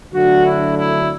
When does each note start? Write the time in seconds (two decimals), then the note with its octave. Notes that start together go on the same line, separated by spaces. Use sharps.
0.13 D3 F#3 A3 D4 F#4
0.44 E4
0.76 E4